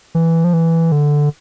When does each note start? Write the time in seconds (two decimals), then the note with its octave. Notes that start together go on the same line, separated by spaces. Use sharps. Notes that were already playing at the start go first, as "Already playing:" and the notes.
0.15 E3
0.44 F3
0.53 E3
0.92 D3